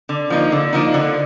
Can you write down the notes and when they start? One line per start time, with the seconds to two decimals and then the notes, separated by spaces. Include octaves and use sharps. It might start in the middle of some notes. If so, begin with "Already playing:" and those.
0.09 D3
0.30 F3 A#3 D#4
0.52 D3
0.73 F3 A#3 D#4
0.94 D3